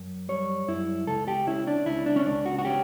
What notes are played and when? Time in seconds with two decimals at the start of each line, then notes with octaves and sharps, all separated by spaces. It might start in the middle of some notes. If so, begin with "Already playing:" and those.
Already playing: F#2
0.29 G3 C#5
0.68 F#2 E4
1.07 C#2 A4
1.28 G4
1.47 C#4 E4
1.67 D4
1.86 C#2 E4
2.06 D4
2.16 C#4
2.26 C#2 D4
2.46 F#4
2.59 F#4
2.65 C#4 G4